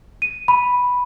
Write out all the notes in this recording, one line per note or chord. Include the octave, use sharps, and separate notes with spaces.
D#7
B5